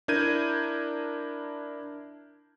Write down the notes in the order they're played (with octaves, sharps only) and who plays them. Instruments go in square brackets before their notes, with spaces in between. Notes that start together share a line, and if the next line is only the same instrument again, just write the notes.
[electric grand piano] D4 E4 A#4 G6 G#6 D#7